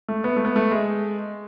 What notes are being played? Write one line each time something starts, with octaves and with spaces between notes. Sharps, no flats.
A3
B3
A3
B3
A3
G#3